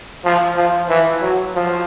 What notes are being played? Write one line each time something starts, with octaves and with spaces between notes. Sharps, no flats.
F3
F3
E3
F#3
F3